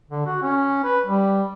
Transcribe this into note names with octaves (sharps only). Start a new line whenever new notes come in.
D3
F#4
C#4
B4
G3